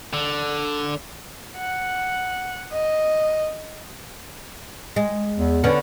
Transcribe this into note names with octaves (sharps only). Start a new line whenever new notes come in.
D3
F#5
D#5
G#3
E2
D3 B3 C#4